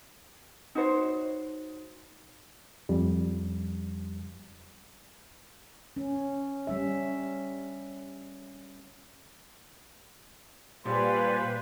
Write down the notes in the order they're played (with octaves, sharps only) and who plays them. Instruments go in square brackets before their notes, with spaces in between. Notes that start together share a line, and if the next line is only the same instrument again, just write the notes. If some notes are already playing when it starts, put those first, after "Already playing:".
[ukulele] D#4 F#4 C5 C#5
[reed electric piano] F2 G3
[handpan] C#4
G3 C#4 E5
[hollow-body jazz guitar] A#2 [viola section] G3 B4 [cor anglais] C5 [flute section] D5 F5 G#5